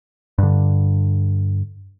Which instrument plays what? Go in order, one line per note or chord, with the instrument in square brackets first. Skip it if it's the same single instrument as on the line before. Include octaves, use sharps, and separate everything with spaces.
[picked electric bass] G2 D3